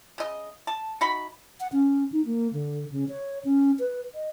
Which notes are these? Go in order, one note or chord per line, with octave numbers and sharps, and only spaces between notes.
C#3 D#5
A5
D#4 F#4 B5
F#5
C#4
D#4
A#3
D3
C#3
C#5
C#4
B4
D#5